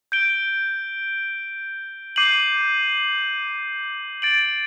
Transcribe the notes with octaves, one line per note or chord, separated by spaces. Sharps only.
G6 D7 G7
D6 G6 C7 D#7 F#7
A6 D7 F#7